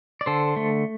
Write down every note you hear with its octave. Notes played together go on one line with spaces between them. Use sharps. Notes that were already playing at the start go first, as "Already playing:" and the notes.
D5
D3 A4 C5
A3